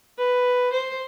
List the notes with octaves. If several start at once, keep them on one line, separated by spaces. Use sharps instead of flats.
B4
C5